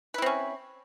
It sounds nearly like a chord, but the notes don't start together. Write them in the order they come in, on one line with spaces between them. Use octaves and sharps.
B4 E4 C4 C#4